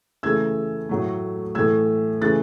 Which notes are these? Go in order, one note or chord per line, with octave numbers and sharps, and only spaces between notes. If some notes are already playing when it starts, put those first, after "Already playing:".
C#3 E3 A3 E6 G#6
A2 F#3 A3
A2 E3 A3 E6 G#6
C#3 E3 A3 F#6 A6